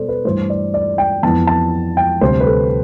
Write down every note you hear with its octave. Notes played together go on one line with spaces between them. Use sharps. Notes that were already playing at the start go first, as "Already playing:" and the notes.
Already playing: B2 G3 A4 C5 D5
B4
G2 E3 A3 C5
D5
D5
G5
F2 E3 B3 A5
A5
G5
D2 C3 G3 C5
B4
A4